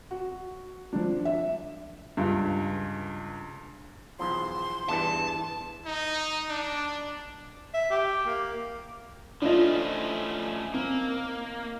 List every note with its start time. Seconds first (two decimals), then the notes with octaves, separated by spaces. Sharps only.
0.11 F#4
0.93 F3 D4
1.25 E5
2.17 C#2 G2
4.19 B1 E2 F3 C6
4.89 E2 G2 E3 A5
5.86 D#4
6.49 D4
7.74 E5
7.91 G4
8.26 A#3
9.42 F3 A3 C#4 D4 E4 F4 D#5
10.74 A#3 C4